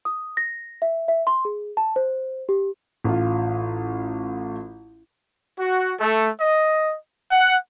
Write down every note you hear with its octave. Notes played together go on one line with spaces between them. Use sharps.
D#6
A#6
E5
E5
C6
G#4
A5
C5
G4
A1 F4
F#4
A3
D#5
F#5